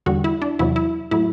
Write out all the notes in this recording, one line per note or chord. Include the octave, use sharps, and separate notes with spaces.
E2 D3 G3 F#4
E4
D4
E2 C3 F#3 E4
E4
A2 F#3 E4